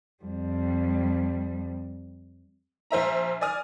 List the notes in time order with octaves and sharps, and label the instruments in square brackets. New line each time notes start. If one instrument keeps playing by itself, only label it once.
[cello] F2 G3
[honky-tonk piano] A#1 C5 E5 A#5
D5 G#5 D#6 F6